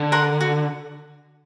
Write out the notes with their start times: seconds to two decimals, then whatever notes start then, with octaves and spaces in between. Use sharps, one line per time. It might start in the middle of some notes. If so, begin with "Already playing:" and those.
Already playing: D3
0.12 A#4 F#5 C6
0.41 F#4